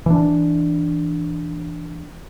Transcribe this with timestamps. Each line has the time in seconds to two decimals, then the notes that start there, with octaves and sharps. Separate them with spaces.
0.06 E3 D4